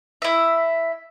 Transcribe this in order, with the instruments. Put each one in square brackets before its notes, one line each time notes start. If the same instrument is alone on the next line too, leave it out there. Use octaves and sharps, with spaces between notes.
[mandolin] E4 E5